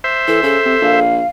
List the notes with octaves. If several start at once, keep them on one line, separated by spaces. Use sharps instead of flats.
C5 E5
E3 A4
C#3 A4
C3
A#1 F5